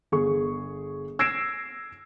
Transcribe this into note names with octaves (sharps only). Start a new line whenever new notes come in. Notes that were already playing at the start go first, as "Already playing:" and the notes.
G1 G#4 C#6
E6 G#6 A#6 C7 D7 E7